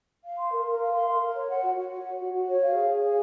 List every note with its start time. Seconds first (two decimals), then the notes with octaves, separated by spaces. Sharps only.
0.25 F5
0.38 C6
0.52 A#4
0.65 A#4
0.81 F5
0.93 C6
1.08 A#4
1.21 A#4
1.35 C#5
1.50 F#5
1.64 F#4
1.77 F#4
1.91 C#5
2.06 F#5
2.20 F#4
2.34 F#4
2.48 C#5
2.62 F5
2.75 G#4
2.89 G#4
3.03 C#5